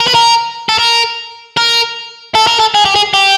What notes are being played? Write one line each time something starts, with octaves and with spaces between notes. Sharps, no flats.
A#4
B4
A#4
A4
A#4
A#4
A4
A#4
A4
G#4
G4
G#4
G4